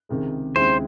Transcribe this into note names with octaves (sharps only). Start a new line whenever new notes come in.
C#2 C3 D#3 G#3
D#2 C#3 G#3 C4 E4 C5